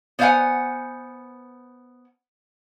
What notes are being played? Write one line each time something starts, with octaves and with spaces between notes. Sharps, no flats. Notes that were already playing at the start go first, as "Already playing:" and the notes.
B3 C5 C#5 F5 F#5 G#5